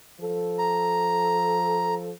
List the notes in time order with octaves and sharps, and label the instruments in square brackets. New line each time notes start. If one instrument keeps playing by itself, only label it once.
[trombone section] F3 A4
[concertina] A#5